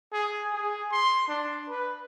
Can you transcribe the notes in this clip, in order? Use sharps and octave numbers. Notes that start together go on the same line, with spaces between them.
G#4
G#4
C6
D4
B4